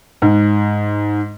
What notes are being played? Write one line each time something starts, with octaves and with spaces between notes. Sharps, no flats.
G#2